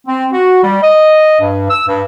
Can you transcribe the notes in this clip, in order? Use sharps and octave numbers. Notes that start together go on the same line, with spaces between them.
C4
F#4
G3
D#5
G2
E6
G2